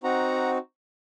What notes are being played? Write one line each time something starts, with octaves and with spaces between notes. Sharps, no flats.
C4 D#4 F#4 F#5 A#5